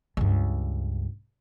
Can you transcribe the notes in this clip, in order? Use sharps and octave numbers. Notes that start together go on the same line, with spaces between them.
C#2 G2